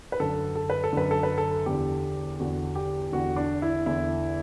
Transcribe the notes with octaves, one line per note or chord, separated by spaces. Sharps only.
B4
F#2 D3 A4
A4
B4
A4
F#2 D3 B4
A4
B4
A4
E2 D3 G4
E2 D3 F#4
G4
E2 D3 F#4
D4
E4
E2 D3 E4